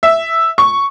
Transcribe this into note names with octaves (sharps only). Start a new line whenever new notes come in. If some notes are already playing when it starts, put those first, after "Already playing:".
E5
C#6